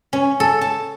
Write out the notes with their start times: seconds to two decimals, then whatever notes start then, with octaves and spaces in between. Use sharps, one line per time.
0.13 C#4
0.40 A4
0.61 A5